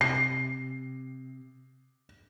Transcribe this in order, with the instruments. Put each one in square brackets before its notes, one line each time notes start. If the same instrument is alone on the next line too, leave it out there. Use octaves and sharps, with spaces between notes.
[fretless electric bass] C3 [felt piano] C7